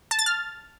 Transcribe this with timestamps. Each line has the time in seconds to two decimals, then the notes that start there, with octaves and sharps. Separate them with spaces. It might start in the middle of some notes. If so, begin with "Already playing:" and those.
0.11 A5
0.19 A6
0.26 F6